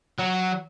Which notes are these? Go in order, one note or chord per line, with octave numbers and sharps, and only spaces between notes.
F#3